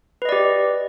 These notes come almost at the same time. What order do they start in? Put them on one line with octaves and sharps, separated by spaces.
B4 D#5 D5 G4